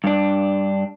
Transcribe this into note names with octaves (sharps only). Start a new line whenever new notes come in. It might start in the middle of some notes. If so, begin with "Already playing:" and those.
G2 D4